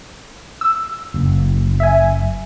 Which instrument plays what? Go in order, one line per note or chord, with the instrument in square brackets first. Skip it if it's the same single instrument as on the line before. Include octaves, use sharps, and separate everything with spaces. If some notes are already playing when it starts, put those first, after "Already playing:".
[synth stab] E6
[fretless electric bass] F#1
[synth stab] E5 G#5